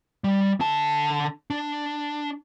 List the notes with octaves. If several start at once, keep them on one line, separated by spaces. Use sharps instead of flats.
G3
D3 A5
D4